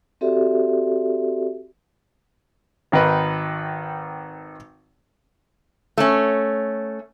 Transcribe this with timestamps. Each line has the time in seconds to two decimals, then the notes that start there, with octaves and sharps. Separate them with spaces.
0.21 C4 F#4 G4 A4 D5 E5
2.92 G#1 D#3 D#4 B4
5.98 A3 C#4